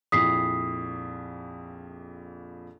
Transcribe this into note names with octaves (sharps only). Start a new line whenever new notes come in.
A#1 F2 E4 D#6 B6 C7